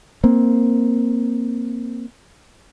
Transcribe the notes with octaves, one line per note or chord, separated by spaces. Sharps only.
A#3 C4